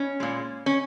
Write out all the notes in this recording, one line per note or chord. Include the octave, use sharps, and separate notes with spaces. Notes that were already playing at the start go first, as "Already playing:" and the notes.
Already playing: C#4
A#2 G#3
C#4